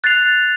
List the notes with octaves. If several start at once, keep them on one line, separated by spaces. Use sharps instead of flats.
F#6 A6 C7 F7